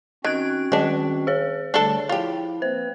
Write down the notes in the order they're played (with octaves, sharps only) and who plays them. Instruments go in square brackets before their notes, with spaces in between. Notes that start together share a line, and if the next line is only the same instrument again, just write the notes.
[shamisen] D#3 [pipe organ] C4 C#4 F#4 [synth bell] F#6 G#6 D7
[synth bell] D#3 D#5 [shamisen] G#3 D4
[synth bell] G#4 C#5
[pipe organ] D3 G3 A3 [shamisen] D4 A4
[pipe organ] F3 E4 [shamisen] F4 G4
[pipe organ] A#3 C4 B4 [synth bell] C5